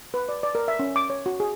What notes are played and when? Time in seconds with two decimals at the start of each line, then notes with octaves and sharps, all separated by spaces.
0.14 B4
0.29 D5
0.43 D5
0.55 A#4
0.68 E5
0.79 C#4
0.96 D6
1.10 C#5
1.26 F#4
1.40 G#4